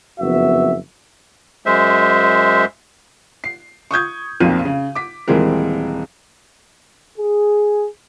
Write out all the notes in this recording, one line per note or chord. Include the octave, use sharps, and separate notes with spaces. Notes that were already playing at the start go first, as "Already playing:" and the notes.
F#1 F2 B3 F#4 E5
F#2 G#3 C5 E5
C7
C#6 D#6 G6 G#6
B1 F2 A#2 C4 D#7
C#3
D6 B6
D#1 E3 G#3 C4 A#4
G#4